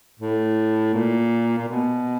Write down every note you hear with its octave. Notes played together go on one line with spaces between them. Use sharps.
A2
A#2
A#2
B2